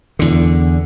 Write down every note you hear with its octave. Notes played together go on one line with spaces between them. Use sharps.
E2 D3